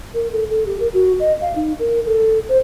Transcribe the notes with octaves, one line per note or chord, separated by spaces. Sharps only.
A#4
A4
A4
G4
A#4
F#4
D#5
F5
D#4
A#4
A4
C5